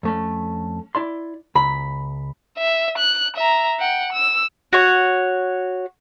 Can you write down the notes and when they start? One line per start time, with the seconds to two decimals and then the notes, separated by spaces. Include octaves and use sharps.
0.03 F2 A3 C#4
0.95 E4 D5 C6
1.55 C#2 B5
2.58 E5
2.98 F#6
3.36 E5 A#5
3.80 F#5 G5
4.12 E6
4.73 F#4 C#5